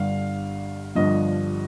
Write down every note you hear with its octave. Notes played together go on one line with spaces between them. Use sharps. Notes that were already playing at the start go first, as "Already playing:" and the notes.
Already playing: G1 G2 D3 F5
G1 G2 D3 F3 D#5